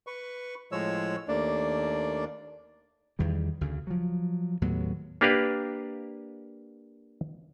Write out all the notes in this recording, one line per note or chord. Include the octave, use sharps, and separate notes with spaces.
B4 C#6
A2 F3 G#3 C#5 E6
D#2 A3 A#3 D4 D5
E2 D#3 G3
D2 C#3
F3 F#3
D#2 A2 F#3 B3
A#3 D4 G4 A#4 B4 F5